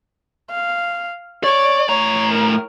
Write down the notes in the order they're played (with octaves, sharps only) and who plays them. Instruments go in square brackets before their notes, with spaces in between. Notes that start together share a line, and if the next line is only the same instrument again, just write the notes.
[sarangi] F5
[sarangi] C#5 [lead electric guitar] D5
[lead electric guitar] A2 A#5 [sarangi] C#5
[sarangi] A#4